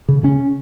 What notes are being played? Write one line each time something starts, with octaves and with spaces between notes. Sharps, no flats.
C#3
C#3 C#4